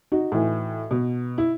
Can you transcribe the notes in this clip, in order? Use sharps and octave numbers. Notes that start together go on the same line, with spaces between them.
D#4 F#4
A2 E3
B2
E4